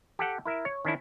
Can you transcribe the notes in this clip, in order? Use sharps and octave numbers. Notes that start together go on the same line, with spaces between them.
G4 A4 F#5 G5
E4 A#4 E5
C#5
D#3 C#4 D4 E4